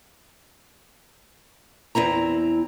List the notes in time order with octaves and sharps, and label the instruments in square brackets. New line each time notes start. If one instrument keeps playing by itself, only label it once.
[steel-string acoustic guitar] E2 C4 E4 A#5